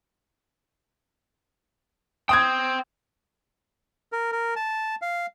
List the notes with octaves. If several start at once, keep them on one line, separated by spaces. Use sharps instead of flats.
G5 C6 D#6 G#6
A#4
A#4
A5
F5